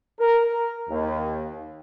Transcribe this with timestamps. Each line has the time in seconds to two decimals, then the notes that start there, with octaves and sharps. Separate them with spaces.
0.20 A#4
0.89 D#2